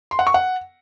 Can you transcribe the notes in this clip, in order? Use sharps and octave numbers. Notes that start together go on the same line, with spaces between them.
C6
F#5
C#6
F#5